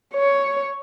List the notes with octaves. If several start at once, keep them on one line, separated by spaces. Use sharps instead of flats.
C#5